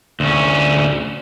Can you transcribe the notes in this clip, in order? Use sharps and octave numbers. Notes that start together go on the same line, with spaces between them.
D2 C#4